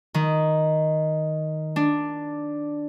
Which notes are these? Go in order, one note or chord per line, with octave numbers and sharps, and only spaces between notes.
D#3
D4